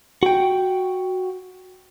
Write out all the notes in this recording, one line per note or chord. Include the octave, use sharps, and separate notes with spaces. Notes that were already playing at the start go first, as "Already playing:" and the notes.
F#4 G5